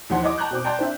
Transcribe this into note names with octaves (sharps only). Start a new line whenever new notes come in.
D#2 E3 F3 F#5 C6
E4 C#5 D#5 D6
G5 A5 A#5 C#6 F#6 G6
B2 C4 D6
D5 G5 A5 A#5 C6 G6
C4 D4 E5